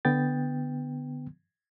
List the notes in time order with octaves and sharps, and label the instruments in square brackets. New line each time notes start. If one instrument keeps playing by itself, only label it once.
[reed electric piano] D3 B3 G5 A6